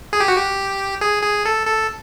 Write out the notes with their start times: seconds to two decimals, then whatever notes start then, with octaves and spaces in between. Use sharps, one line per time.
0.13 G#4
0.20 G4
0.28 F#4
0.36 G4
1.01 G#4
1.23 G#4
1.45 A4
1.67 A4